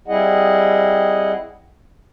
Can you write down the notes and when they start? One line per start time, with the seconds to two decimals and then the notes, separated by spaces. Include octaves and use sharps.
0.08 G3 C4 E4 G#4 D#5 F#5